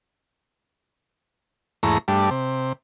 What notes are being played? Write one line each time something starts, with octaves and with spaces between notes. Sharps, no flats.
E2 G#2 A3 A#5 C#6
G2 G3 A3 D4
C3